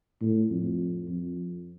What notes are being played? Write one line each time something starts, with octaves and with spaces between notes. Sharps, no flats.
A2
F2
F2